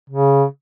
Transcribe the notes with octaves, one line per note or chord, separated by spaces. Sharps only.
C#3